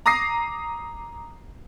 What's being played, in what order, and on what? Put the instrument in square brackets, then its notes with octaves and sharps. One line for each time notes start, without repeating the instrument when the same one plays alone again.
[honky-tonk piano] A#5 D6 D#6 A#6 C7